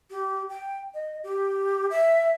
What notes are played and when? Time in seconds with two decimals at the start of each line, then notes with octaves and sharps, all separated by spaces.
0.10 G4
0.50 G5
0.94 D#5
1.24 G4
1.90 E5